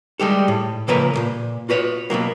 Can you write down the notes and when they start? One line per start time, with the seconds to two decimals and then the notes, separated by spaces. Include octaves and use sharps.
0.20 G3 G#3 G4 A4
0.48 A2
0.88 C#3 F3 A#3 A4 B4 A#5
1.14 C2 A#2
1.69 F4 F#4 B4 C#5
2.10 B2 D#3 F#3 A#3